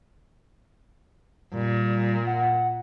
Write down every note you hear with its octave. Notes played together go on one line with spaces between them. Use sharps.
A#2 G3
F#5